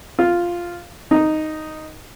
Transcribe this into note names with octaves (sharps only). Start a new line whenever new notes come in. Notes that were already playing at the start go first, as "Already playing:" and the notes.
F4
D#4